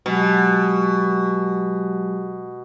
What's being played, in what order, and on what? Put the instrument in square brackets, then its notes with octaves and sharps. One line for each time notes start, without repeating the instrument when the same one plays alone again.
[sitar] B2 [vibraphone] F#3 G#3 G4